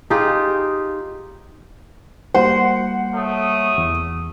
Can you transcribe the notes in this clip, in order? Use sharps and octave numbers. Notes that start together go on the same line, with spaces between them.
D#4 F4 G4 G#4
G3 A#3 F#4 C5 F#5
A3 C#5 D#6
E2